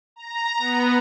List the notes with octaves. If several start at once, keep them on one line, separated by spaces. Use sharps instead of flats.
A#5
B3